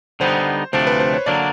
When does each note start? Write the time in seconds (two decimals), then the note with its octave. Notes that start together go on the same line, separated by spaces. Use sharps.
0.20 D3 G3 B3 D#4 C5
0.73 D2 C3 F3 A3 D4 C5
0.87 B4
1.00 C5
1.14 C#5
1.26 D3 F#3 A#3 D4 D5